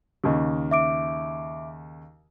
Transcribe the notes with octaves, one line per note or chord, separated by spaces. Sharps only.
D#2 C#3
E5 D6 D7